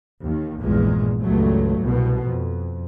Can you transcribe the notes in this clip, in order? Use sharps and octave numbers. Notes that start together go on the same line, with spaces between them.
D#2 D#3
A#1 E2 G2 A#2 G#3
C#2 G2 F#3 A3
C2 B2
F2